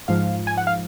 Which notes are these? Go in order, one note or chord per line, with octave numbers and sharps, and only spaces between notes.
G#2 F3 F5
G#5
F#5
F5